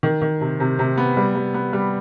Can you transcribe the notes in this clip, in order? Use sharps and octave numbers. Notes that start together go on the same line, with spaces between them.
D#3
D#3
C3
C3
C3
B3
G3
G3
B3
G3